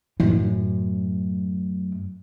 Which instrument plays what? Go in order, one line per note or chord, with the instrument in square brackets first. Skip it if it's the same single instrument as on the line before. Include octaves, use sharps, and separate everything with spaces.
[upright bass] F#2 A2